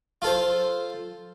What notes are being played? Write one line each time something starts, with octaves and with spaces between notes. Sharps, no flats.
F4 A4 C5